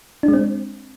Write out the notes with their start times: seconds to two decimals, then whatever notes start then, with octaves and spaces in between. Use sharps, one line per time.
0.23 D4
0.28 G#3
0.33 C4